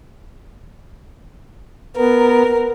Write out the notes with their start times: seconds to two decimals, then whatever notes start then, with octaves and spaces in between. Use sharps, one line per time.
1.97 B3 A#4